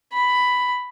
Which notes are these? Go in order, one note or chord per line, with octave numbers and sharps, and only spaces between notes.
B5